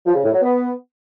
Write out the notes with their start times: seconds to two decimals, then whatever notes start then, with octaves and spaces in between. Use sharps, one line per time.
0.06 F3
0.15 C#3
0.24 A2
0.33 F#3
0.42 B3